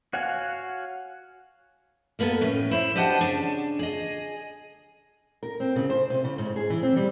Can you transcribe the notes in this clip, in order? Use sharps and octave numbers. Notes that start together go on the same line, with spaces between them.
F#4 C#5 F5 F#5 G#5
G3 A#3 B3 G4 A4
A2 C#4
E4 C5
D4 G4 C5 D#5 F#5 A5
C#3 D4
G#4 D#5
A#4
C4
C#3
C5
C3
C#3
G#2
G#4
E3
C4
G3